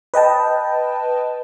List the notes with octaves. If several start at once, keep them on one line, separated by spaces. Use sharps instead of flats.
B4 D#5 G5 A5